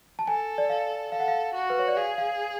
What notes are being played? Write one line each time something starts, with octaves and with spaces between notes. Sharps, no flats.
A5
A4 G#5
D5
F5
A4 F5
F#5
F5
F#4
B4
C#5
D5
G#4 F5
F5